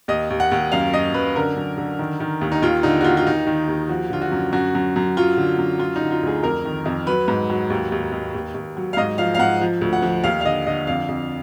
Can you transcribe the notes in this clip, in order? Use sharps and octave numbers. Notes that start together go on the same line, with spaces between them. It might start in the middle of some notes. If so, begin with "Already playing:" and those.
D#2 D#5
D#2
F#5
D#2
F#2 F5
F#2 D#5
F#2 B4
D3 A#4
F#2
D3
D#3
D#3
D#2
D#4
D#2 F4
D3 D#4
F#4
D#2 F4
F4
D#2 D#4
D#3
D#2
F3 F#4
D3 F4
F#4
F#2
F#2 F#4
F#2
F#2
F#3 F4
D3
F#2
F#3 F4
D#4
D3
F4
D2 G#4
F2 A#4
D#3
F2
F#3 B4
G#2
F#3
D#2
D#2
D#2
D#2
D#2
F#3
F5
G#2 D#5
F3 F5
F5
G#2 F#5
F3
D2
F#5
F3
D#2 F5
F5
D3 D#5
D3 D#5
F2 F5
F2